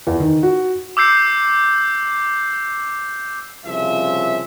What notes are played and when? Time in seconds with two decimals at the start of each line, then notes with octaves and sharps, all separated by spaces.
0.07 E2
0.20 D#3
0.43 F#4
0.97 D6 E6 G6 C7
3.66 C2 C#3 F3 E5